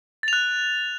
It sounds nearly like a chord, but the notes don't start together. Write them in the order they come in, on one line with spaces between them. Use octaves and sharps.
A6 F7 F#6